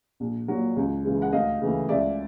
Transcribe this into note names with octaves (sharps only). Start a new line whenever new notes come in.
A#1
A#2 F#3
C#2
C#3 E3 G#3
F#5
D2 D#5 F5
C#3 E3 A3
C#2 D5 E5